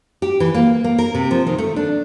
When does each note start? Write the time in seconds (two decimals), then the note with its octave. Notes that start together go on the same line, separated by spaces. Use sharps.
0.22 G4
0.40 E3
0.54 A#3
0.84 A#3
0.98 A#4
1.15 C3
1.31 F3
1.47 D#3
1.58 A3
1.76 D4